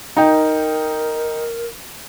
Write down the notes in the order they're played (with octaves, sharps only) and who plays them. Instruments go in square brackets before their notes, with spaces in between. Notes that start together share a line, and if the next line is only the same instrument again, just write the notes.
[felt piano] D#4 G5 [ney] A#4